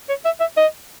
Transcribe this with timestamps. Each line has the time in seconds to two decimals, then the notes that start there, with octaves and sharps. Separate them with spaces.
0.09 C#5
0.25 E5
0.40 E5
0.57 D#5